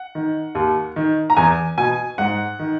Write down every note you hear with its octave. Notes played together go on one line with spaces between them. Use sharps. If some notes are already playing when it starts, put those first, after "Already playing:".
Already playing: F#5
D#3
D#2
D#3
A#5
E2 G#5
B2 G#5
G#2 F#5
D#3